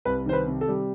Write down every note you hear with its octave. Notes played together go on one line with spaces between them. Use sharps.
C2 B4
D#3 C5
B4
C3
A4
G3